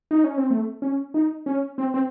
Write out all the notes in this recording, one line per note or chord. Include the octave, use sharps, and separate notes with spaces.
D#4
C#4
C4
A3
C#4
D#4
C#4
C4
C4